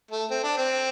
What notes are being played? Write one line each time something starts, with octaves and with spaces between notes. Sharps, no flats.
A3
C4
D4
C4